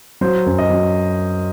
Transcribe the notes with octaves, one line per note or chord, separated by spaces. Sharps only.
F#3 C5
F#2
D#5
F#3